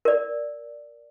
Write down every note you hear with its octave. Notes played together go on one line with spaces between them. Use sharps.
A#4 D5